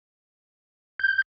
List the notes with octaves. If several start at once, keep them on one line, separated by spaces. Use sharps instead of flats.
G6